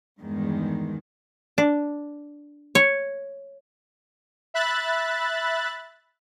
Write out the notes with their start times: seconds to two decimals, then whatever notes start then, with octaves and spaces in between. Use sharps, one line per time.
0.20 E2 G2 D#3 G#3
1.58 D4
2.75 C#5
4.54 E5 B5 F#6 A6